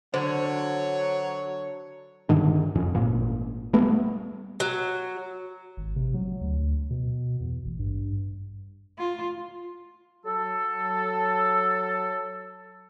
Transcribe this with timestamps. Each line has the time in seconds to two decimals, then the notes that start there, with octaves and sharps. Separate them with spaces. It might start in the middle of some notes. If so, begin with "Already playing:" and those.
0.14 D3 F#3 C5 C#5
2.29 G2 D3 D#3 D4
2.75 F2 C#4
2.95 G#1 A#2
3.73 G3 A3 B3
4.60 F#3
5.77 G#1
5.96 C3
6.14 F#3
6.41 D2
6.90 B2
7.41 E2
7.66 A1
7.79 G2
8.98 F4
10.24 F#3 A4